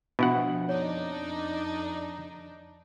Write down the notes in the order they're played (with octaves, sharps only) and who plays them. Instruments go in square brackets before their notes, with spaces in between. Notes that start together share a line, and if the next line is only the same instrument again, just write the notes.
[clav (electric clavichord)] B2 E4 F#5 [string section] F3 [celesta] D4
[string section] F2 D4 D#4 [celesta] C#5